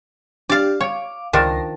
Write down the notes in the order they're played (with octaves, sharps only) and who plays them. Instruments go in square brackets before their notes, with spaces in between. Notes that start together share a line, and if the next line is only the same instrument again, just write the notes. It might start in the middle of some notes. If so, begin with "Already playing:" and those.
[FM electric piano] D4 G4 [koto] D5 F5
[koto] C#5 [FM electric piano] F5 D6
[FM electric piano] C#2 C6 A#6 [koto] D#3 F3 D4